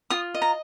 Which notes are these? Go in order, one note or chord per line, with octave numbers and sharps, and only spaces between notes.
F4 D#6
D#5
A#5